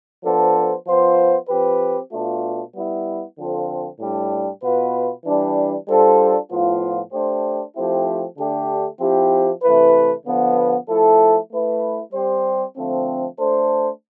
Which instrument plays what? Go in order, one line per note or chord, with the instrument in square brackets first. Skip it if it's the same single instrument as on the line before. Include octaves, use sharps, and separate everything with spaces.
[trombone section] F3 B3 D4 A4 C5
F3 B3 F4 C5
F3 C4 G4 B4
B2 A3 D4 F4
G3 B3 E4
D3 F3 C4 F4 A4
A2 G3 D4
B2 B3 F4 B4
E3 G3 D4
G3 D4 F4 A4 C5
A2 F3 B3 F4
A3 D4 G4 C5
F3 A3 C4 E4 G4
D3 A3 D4 G4
F3 C4 E4 G4
C3 E3 A3 E4 B4
D3 F3 B3
F3 A3 E4 A4
A3 E4 B4
G3 C4 G4 C5
D3 F3 A3 C4
A3 D4 A4 C5